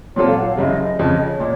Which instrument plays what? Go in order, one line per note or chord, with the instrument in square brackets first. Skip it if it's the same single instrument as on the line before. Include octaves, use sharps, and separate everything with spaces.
[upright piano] A#2 F#3 C4 F4 A4 [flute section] C#5
[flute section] F5
F#5
F5
[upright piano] F#1 F#2 C#3 [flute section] D#5
[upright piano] F2 C#3 F3 [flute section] D#5
[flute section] D#5
C#5
[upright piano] A#2